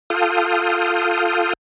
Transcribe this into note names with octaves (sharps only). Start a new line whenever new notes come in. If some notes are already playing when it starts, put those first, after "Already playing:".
F4 A4 F5 G5 D#6